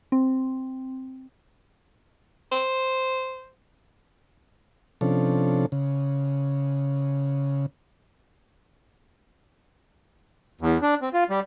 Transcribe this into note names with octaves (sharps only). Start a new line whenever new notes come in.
C4
C5
C3 F3 C#4 D4 A4
C#3
E2
D4
C4
F4
G3